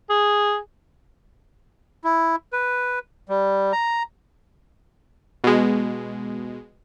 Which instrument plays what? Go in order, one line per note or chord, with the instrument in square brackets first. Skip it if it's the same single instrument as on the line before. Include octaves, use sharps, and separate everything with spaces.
[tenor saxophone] G#4
[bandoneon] E4
B4
G3
A#5
[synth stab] B2 G#3